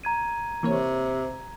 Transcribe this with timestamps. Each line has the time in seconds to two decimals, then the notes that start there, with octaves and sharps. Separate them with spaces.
0.04 A#5 G#6 D#7
0.63 C3 E3 A#3 C#5